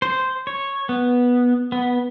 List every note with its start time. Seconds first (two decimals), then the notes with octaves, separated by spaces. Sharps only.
0.02 C5
0.47 C#5
0.89 B3
1.72 B3